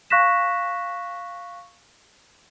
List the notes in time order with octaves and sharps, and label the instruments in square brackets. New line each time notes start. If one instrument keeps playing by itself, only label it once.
[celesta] F5 C#6 F#6 A#6 B6 E7